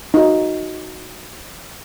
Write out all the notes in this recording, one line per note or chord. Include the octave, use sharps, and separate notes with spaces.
D#4 F#4